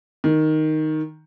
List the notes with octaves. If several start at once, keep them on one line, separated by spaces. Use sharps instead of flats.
D#3